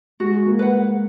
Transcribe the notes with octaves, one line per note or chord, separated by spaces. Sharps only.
G#3 F#4
A#3
B4 F#5